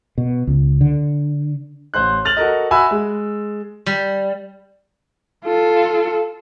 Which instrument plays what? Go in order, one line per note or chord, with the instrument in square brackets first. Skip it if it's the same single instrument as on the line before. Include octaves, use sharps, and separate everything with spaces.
[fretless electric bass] B2
C#2
D3
[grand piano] A1 C5 C6 F#6
F6 A6 F7 F#7
F#4 A4 A#4 D#5
F#4 E5 G#5 B5 E6
G#3
[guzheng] G3
[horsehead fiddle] F4 A4